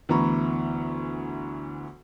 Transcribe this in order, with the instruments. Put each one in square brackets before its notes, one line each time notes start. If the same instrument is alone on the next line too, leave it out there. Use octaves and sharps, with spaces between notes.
[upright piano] D2 E3 B3 A#5 B5 C#6